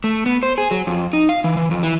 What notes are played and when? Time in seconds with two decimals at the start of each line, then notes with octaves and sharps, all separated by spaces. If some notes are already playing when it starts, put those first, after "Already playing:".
0.04 A3
0.26 B3
0.43 C5
0.58 G#4
0.71 F#3
0.87 F2
1.13 D#4
1.29 F5
1.44 E3
1.57 E3
1.71 F2
1.83 E3